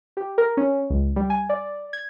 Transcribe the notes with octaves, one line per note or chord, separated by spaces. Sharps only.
G4
A#4
C#4
C#2
G3
G#5
D5
G#6